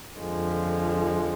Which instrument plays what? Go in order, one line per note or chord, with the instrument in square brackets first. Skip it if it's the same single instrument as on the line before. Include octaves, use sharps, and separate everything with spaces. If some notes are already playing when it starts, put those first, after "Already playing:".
[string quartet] F2 D3 F3 G#3